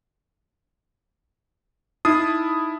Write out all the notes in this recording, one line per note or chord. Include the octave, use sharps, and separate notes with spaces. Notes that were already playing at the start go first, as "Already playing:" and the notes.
D#4 E4 D#6